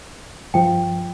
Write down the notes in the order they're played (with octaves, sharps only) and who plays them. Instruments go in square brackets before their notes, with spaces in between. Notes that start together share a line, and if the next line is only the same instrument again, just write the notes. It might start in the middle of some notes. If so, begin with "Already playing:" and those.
[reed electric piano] G2 F3 [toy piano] G5